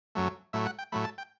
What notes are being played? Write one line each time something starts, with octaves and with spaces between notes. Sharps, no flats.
F#2 F#3 A3
A2 F#3 A3 E5
F#5
G5
A2 F#3 A3 B5
A5
G5